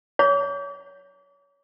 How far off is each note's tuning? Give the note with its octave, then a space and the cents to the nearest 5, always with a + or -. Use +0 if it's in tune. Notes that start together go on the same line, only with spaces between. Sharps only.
C#5 +20 D6 -40